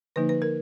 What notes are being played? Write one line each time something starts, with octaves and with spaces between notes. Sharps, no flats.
D3 F3 A#3 D#4 B4
B4
A#4